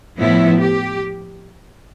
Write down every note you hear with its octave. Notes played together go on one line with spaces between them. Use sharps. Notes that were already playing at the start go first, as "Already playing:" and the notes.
A2 F3 B3 E4
G4